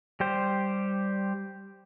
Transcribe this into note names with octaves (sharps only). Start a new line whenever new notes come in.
G3 G4 C5